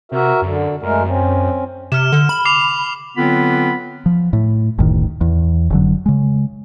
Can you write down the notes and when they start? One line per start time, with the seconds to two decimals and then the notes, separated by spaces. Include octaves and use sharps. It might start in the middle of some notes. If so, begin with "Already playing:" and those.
0.12 C3 F#4 A#4 E5
0.42 F#2 D3
0.83 F#2 G#3 A3 A#4
1.05 C4 C#4
1.92 C3 F6 E7
2.12 D3
2.29 B5
2.45 D6 C7 F7
3.17 D3 F#3 B3 C4 F4 B5
4.06 F3
4.33 A2
4.78 F#1 D2 A2 D#3
5.21 E2
5.70 F1 D3 F#3
6.06 C#3 G#3